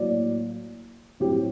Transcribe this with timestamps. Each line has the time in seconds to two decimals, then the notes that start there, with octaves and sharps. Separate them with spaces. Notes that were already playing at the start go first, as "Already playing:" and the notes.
Already playing: A2 F#3 A#3 D5
1.20 A2 F#3 C4 G4